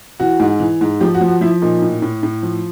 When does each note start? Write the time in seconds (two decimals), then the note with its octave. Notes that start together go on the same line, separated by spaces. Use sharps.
0.20 E3 F#4
0.39 G#2
0.60 E3
0.81 G#2
1.01 F3 G4
1.15 F#4
1.21 F3
1.28 F#4
1.41 F3 E4
1.62 A#2 D#4
1.82 A2
2.02 A2
2.23 A2
2.43 F3